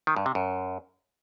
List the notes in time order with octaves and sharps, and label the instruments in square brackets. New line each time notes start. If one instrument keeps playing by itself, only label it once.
[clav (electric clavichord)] D#3
G2
C3
F#2